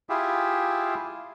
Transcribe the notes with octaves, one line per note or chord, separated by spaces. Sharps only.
E4 F4 G4 G#4 E5